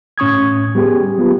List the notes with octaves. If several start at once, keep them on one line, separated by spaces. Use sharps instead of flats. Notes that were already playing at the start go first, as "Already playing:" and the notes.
A2 C#4 C#6 D#6 G#6
G3 B3 G4 G#4
F#3 B3 F4 G4